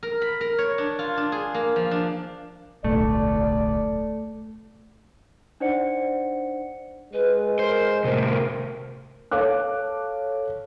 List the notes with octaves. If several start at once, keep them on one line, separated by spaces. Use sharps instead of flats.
A#4
B5
A#4
C#5
D4
F4
D4
G#4
A#3
F3
D4
D1 B1 A3 D5
D4 D#4 C5 D5 F#5 C#7
G#3 B4
A#4 C5
A2 C3 A#4 C5
A4 C#5 F5 D6 F#6